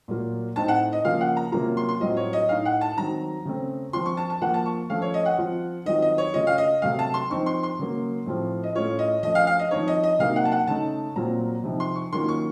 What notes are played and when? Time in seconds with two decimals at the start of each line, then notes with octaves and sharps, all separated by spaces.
0.08 A#2 F#3 A#3 F4
0.56 A2 A3 C4 D#4 A5
0.68 F#5
0.93 D#5
1.05 C#3 F3 A#3 F4 F5
1.21 F#5
1.37 A#5
1.52 C3 F#3 A#3 C#4 F4 A#5
1.77 C6
1.89 C6
2.00 A2 F#3 C4 F4 D#5
2.17 C#5
2.33 D#5
2.49 A2 A3 D#4 F5
2.65 F#5
2.81 A5
2.97 D#3 F#3 C4 A#5
3.45 C#3 A3 C4
3.93 F3 C4 F4 C6
4.06 C#6
4.17 A5
4.30 A5
4.41 F3 A#3 F4 F#5
4.54 A5
4.66 C#6
4.90 F3 A3 C#4 F5
5.02 C#5
5.14 D#5
5.25 F#5
5.38 F3 C4 F4
5.86 D#3 F#3 C4 F4 D#5
6.02 D#5
6.18 C#5
6.34 C#3 A3 C#4 F4 D#5
6.47 F5
6.58 D#5
6.82 C3 F#3 A3 F5
6.99 A5
7.14 C6
7.31 F3 C4 D#4 C#6
7.46 C6
7.63 C6
7.79 C#3 F#3 A#3
8.26 A2 F3 C4 F4
8.63 D#5
8.75 A2 A3 C#4 F4 C#5
8.99 D#5
9.23 F3 A3 C#4 D#5
9.35 F5
9.47 F5
9.59 D#5
9.71 F3 C4 D#4 C#5
9.88 D#5
10.03 D#5
10.19 C3 F#3 A#3 D#4 F5
10.36 F#5
10.45 A5
10.52 F#5
10.67 C#3 A3 D#4 A5
11.15 A#2 F#3 C4 F4 A#5
11.64 C3 F3 C4 D#4
11.80 C6
11.96 C#6
12.13 D#3 F#3 A#3 C#4 F4 C6
12.29 C#6